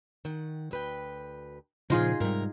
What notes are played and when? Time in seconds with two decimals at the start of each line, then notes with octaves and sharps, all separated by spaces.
0.25 D#3 F#5
0.71 D2 B4 G5
1.90 A#2 C#3 F3 D#4 F4 G#4
2.20 G#2 C3 G3 A#4 E5